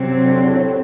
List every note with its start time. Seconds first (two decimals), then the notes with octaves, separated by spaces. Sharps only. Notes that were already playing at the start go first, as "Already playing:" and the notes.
Already playing: C3 F#3 C4
0.25 D3
0.44 A2